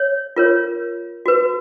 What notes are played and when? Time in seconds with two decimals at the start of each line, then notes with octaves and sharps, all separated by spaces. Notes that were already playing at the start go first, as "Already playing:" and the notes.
Already playing: C#5
0.36 F4 A#4 C#5
1.26 F#4 B4